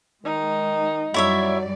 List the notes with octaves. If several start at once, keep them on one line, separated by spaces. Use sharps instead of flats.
D#3 G#3 D#4
F#2 F#3 G3 E4 C#5 D5 E5